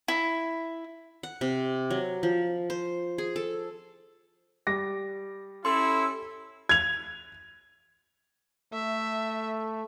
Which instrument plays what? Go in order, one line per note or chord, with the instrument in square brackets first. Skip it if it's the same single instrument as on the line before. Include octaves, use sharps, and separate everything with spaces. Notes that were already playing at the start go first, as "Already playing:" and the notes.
[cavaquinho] E4
[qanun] F#5
C3
F#3
F3
C5
G#4
A4
[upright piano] G3 D6 A#6
[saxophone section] C#4 A4 [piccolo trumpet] E4 [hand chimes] C6
[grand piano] G#6 F7
[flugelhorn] A3 [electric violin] E5